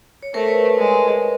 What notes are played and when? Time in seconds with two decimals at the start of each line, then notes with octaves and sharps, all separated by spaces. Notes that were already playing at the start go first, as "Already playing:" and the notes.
0.23 C#5
0.34 A3 A#4 C5
0.48 B4 C#5
0.77 G#3